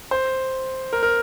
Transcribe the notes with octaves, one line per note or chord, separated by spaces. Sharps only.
C5
A#4
A#4